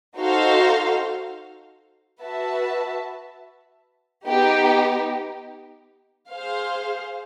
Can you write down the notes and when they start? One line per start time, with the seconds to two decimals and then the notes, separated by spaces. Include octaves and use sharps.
0.18 D#4 F#4 A4 C5 F5
2.22 F#4 B4 E5 A5
4.26 B3 D#4 G4
6.30 G#4 C5 F5